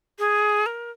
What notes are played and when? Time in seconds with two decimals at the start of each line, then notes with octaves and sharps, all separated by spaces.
0.19 G#4
0.66 A#4